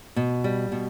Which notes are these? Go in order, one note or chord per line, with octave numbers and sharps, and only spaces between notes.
B2
G3
B2